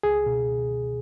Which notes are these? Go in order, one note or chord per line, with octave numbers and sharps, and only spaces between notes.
C#2 G#4
B2